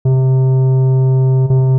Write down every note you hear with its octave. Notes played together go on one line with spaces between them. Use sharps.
C3
C3